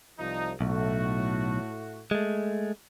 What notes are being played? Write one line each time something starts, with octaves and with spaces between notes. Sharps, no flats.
C2 F3 D#4
B1 A2 A3 F#4
G#3 A3